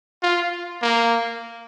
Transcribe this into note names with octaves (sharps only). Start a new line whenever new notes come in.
F4
A#3